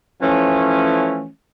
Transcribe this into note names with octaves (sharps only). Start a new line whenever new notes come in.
E3 F3 A3 C#4